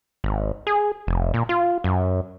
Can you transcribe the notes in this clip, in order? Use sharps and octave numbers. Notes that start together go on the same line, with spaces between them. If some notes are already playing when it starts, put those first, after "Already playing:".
G#1
G#4
F1
A#2
F4
F#2